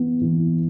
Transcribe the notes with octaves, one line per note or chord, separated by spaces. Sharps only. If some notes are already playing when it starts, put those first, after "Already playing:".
Already playing: E3 B3
E3